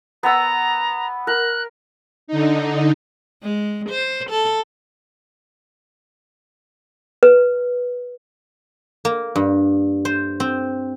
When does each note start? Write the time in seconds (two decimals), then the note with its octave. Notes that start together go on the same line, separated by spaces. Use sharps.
0.23 B3 A#5 E6
1.27 A#4 F#6
2.27 D3 D#4
3.43 G#3
3.90 C5
4.30 A4
7.23 B4
9.05 A#3
9.36 G2
10.05 C5
10.40 C4